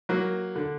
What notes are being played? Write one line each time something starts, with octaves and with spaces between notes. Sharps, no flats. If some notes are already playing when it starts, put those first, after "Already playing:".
F#3 A#3
D3